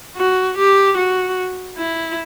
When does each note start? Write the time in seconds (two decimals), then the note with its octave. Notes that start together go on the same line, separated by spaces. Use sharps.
0.16 F#4
0.57 G4
0.98 F#4
1.78 E4